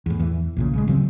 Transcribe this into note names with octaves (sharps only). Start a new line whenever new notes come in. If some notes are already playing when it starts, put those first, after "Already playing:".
E2 A2
E2 E3
A#1 A#2 C#3
A1 C#3 G#3
D2 C#3 F#3 C4